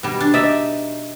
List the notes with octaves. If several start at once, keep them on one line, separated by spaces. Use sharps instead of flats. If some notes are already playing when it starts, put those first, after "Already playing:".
B2 G3
D4
D#4 D5 E5